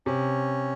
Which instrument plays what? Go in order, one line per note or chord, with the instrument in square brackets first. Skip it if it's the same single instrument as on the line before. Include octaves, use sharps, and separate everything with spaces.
[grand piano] C3 [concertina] C#4